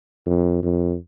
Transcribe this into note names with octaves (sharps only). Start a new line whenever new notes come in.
F2
F2